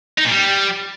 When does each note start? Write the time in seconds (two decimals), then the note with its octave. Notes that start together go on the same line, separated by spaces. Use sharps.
0.18 D#4
0.25 A#2
0.31 G3